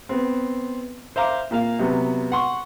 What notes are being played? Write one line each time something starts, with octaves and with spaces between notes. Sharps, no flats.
B3 C4
C5 E5 F5 A#5 D6
A#2 A#3 F5
C3 F#3 B3
F#5 C6 C#6